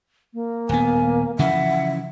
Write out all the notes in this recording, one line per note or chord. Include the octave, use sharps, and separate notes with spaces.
A#3
D#1 B3 G#5
C#3 E3 F3 E5 F#5